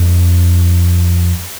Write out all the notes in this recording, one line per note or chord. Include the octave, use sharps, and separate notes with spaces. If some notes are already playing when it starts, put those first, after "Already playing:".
Already playing: F2